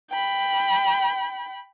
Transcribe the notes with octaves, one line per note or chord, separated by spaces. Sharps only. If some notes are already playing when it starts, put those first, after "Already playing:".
G5 B5